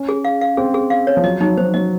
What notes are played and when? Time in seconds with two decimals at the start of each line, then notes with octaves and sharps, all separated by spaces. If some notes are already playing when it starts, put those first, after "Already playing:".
Already playing: C#4
0.09 G#4
0.25 F5
0.41 F5
0.57 C4 G#4
0.74 G#4
0.90 F5
1.07 C#5
1.17 F3
1.24 F#3 D#5
1.41 F#3 D#4
1.57 F#3 C5
1.74 F#3 D#5